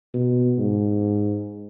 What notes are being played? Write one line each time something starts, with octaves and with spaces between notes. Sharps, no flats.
B2
G#2